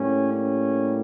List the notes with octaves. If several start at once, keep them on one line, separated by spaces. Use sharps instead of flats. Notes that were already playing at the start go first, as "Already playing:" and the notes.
Already playing: A2 G3 A#3 C#4
C#4